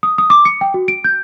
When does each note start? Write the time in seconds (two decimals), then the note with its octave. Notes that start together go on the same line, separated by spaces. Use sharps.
0.03 D#6
0.18 D#6
0.30 D6
0.45 C#7
0.61 G5
0.74 F#4
0.88 D7
1.04 G6